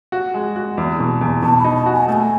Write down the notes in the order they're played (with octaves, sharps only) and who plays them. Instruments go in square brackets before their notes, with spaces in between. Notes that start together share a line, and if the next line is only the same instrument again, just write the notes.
[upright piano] F#4
G#3
F#4
E2
B2
E2
[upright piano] B2 [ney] A5
[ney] B5
[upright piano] D#4
[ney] A5
[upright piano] F#4
[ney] G#5
[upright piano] A3 [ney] A5
[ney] G#5